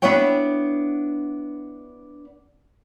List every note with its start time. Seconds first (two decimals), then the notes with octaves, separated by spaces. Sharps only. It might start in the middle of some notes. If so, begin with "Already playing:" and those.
0.02 B3 D4 E4 F#4 C#5 G5